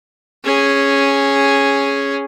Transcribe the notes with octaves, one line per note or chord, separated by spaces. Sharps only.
C#4 G#4